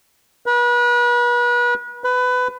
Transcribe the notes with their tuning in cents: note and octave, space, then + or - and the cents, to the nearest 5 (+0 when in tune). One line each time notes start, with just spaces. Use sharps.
B4 -35
B4 +20